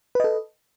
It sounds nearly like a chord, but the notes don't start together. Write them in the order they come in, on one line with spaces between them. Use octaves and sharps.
B4 D#5 A4